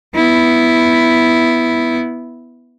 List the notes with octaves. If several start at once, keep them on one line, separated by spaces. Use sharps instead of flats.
B3 E4